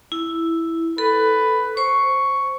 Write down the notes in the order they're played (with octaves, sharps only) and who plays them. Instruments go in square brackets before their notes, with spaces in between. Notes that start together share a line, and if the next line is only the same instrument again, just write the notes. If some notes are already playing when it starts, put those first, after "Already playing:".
[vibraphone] E4
[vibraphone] A4 [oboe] B4
[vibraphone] C5 [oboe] C#6